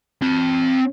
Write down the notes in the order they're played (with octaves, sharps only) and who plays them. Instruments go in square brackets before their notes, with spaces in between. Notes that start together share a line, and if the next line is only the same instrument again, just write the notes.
[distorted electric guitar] C4 A5